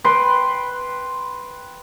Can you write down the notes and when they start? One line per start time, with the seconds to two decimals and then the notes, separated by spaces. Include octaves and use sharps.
0.04 B4 G5 C6